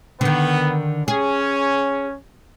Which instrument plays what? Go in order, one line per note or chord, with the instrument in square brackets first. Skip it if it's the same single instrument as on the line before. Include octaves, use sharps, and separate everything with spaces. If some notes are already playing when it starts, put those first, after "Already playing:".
[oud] D3 D#3 [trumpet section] B3
[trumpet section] C#4 [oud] G#4